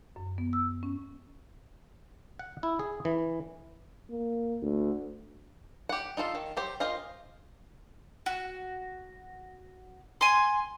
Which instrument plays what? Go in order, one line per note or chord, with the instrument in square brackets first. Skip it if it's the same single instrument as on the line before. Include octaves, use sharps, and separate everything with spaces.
[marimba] F#2
B3
E6
C#4
[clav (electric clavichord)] F#5
E4
G#4
E3
[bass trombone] A#3
D2
[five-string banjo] G4 F#5
D#4 F4 A4 F5
D#3
F#3 G4 C5
F4 A#4 C5 D#5 F5
[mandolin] F#4
G#5 C6